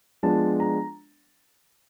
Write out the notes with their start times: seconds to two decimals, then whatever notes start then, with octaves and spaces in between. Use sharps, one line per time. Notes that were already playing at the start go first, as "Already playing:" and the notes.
0.23 F3 G#3 B3 D4 A5
0.60 A#5